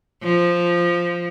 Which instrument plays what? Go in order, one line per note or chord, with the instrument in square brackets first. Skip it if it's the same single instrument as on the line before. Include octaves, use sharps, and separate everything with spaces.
[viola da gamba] F3